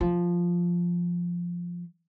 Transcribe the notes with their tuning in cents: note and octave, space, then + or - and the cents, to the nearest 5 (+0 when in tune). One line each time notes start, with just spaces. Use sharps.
F3 +0 F4 +0